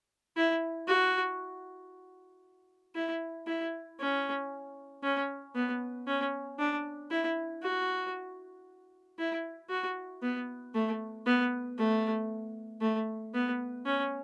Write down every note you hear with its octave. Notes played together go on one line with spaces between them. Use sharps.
E4
F#4
E4
E4
C#4
C#4
B3
C#4
D4
E4
F#4
E4
F#4
B3
A3
B3
A3
A3
B3
C#4